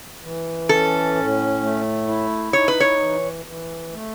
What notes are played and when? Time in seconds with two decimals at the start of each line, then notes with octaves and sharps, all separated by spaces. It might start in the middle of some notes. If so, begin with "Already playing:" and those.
0.23 E3
0.69 C#4 A4
1.15 A2
1.62 A3
2.08 E4
2.53 D#4 C#5
2.68 B4
2.80 C#5
2.99 E3
3.46 E3
3.92 A3